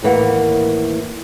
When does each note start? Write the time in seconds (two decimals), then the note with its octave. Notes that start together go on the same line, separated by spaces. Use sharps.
0.03 D#2 A2 E3 A#3 F#5